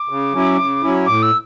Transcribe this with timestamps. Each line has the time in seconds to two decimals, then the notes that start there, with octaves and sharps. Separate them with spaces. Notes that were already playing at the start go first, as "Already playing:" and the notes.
Already playing: D6
0.09 C#3
0.33 F#3 C#4 E4
0.58 C#3
0.83 F#3 C#4 E4
1.06 A2 D6
1.23 E6